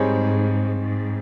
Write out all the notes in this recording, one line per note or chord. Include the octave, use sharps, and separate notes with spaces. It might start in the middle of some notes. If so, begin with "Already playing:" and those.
Already playing: G#2 G3 C4 D#4 G#4 C#5
G#2